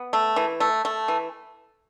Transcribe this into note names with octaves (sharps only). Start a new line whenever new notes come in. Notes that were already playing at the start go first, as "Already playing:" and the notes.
Already playing: B3
A3
E3
A3
A3
E3